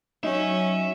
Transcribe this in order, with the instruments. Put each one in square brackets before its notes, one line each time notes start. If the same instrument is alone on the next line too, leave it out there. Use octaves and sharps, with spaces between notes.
[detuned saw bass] F#3 [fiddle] C#4 [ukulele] D#4 [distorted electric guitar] E5